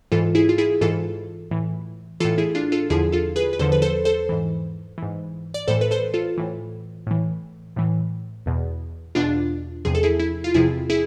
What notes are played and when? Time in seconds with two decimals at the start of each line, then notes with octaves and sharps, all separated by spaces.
0.12 G#2 E3 F4 A4
0.35 E4 G#4
0.49 F4
0.58 E4 G#4
0.81 G#2 E3 F4 A4
1.51 A2 E3
2.20 E3 F4 A4
2.24 A2
2.38 E4 G#4
2.55 D4 F4
2.72 F4 A4
2.90 E2 D3 F3 E4 G#4
3.12 F4 A4
3.36 G#4 B4
3.53 B4
3.59 E2 D3 F3 A4 C5
3.72 B4
3.82 A4 C5
4.05 A4 C5
4.29 G#2 E3
4.98 G#2 E3
5.54 D5
5.68 A2 A4 C5
5.71 E3
5.81 B4
5.91 A4 C5
6.14 F4 A4
6.38 A2 E3
7.07 A2 E3
7.76 A2 E3
8.46 E2 B2
9.15 E2 B2 D4 F4
9.85 E2 C3 F3 G#4
9.95 A4
10.03 E4 G#4
10.20 E4
10.44 F4
10.54 E2 C3 F3 E4 G#4
10.90 E4 G#4